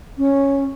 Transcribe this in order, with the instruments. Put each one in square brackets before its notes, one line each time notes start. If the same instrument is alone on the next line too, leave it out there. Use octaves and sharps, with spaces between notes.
[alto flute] C#4